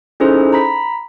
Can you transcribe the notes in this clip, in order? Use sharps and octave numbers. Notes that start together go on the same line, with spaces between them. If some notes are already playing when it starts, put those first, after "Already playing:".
C#4 D#4 E4 G#4 A4 C5
A#5 B5 B6